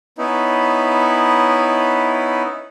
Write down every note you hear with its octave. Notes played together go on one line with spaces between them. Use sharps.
B3 C#4 D#4 E4